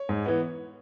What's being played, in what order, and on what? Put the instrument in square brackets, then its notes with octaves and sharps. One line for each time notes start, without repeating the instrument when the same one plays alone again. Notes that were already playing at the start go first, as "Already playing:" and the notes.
Already playing: [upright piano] C#5
[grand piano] G#2
E3 B3